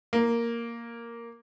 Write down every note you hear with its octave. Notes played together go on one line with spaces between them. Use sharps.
A#3